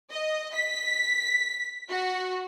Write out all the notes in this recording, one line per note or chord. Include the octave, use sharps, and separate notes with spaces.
D#5
B6
F#4